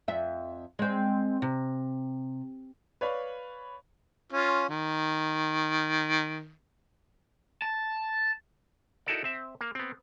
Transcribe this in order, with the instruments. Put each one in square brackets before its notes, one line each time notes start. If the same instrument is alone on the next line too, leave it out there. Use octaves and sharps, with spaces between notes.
[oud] F2 E5
G#3 C4
C3
[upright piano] B4 C#5 D5 F5 B5
[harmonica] C#4 F4
D#3
[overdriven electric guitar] A5
[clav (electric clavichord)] D#4 E4 F#4 A4 A#4 D5
C4 E5
A#3
B3 C4